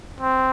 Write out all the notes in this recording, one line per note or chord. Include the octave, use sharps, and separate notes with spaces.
C4